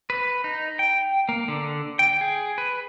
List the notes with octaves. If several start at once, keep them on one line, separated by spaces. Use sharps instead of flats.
B4
D#4
G5
A#3
D3
G5
G#4
B4